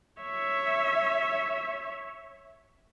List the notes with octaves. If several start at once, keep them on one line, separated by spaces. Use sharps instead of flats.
C#5 E5